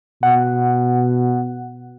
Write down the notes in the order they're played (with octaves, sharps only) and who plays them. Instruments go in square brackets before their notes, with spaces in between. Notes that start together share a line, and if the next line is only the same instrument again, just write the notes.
[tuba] B2 [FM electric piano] F#5